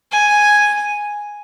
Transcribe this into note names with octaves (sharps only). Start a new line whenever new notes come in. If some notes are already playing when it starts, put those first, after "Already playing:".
G#5